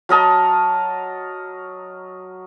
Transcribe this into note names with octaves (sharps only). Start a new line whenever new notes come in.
F#3 A#4 D#5 A5